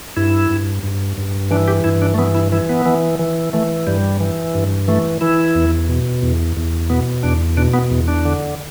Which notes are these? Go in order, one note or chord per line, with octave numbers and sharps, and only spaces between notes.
G2 E4
G2
G2
G2
E3 D4
G4
G2 E4
D4
A3
E3 B3
E4
E3 E4
B3
E3
E3
E3 A3
G2 G3
E3
G2
E3 A3
E3 E4
E2
B2
E2
E2
B2 B3
E2 D4
B2 D4
B3
E2
D4
D3